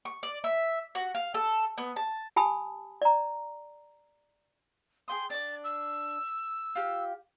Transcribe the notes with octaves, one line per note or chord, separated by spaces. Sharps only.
C#6
D5
E5
F#4
F5
A4
B3
A5
G4 G#5 A5 B5 D#6
D5 A#5
G#4 G5 C6 D#6
D4 D5 A6
E6
F4 G4